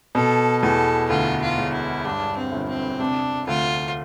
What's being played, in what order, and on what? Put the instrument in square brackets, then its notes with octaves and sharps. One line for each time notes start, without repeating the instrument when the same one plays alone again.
[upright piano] B2 [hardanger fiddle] A4
[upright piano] E2 [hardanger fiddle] A4
[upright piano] D2 [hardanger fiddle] F4
[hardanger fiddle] F4
[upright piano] E1
[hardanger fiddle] E4
[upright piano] G2 [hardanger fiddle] D4
[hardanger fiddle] C4
[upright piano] G1
[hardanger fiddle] C4
[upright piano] C3 [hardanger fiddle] D4
[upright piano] D2 [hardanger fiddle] F4